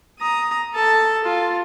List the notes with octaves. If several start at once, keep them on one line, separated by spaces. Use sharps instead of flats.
A#5 D#6
A4 A5
F4